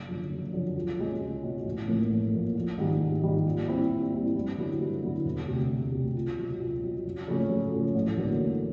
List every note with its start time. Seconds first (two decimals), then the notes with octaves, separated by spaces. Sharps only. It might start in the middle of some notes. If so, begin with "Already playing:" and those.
Already playing: F#1
0.08 F#2 D3 F3
0.30 F#1
0.53 F#2 D3 F3
0.76 C#2
0.97 B2 G#3 C#4
1.20 C#2
1.43 B2 G#3 C#4
1.65 A1
1.88 A2 F3 A#3
2.10 A1
2.33 A2 F3 A#3
2.55 A#1
2.78 G#2 D#3 G3
3.00 A#1
3.22 G#2 D#3 G3
3.45 A#2
3.68 G3 C4 E4
3.90 A#2
4.13 G3 C4 E4
4.35 G2
4.57 D3 F#3 B3 E4
4.80 G2
5.02 D3 F#3 B3 E4
5.24 E1
5.47 D2 C3
5.70 E1
5.92 D2 C3
6.15 C#2
6.37 B2 F#3
6.60 C#2
6.83 B2 F#3
7.05 F#2
7.27 C#3 F3 A3 C#4
7.49 F#2
7.72 C#3 F3 A3 C#4
7.95 A1
8.17 G2 D3 F#3 A#3
8.40 A1